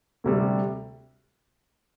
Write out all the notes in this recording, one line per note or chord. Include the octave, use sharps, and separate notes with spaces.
D2 C3 G3